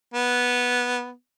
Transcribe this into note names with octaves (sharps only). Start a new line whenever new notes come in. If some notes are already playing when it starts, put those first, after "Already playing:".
B3